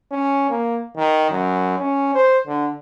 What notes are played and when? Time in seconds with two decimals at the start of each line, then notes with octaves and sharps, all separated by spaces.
0.11 C#4
0.50 A#3
0.97 D#3
1.31 F#2
1.79 C#4
2.15 C5
2.47 D3